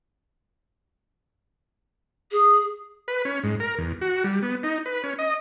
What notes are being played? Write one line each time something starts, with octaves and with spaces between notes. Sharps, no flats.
G#4
B4
C#4
G#2
A#4
E2
F#4
G3
B3
D#4
B4
C#4
D#5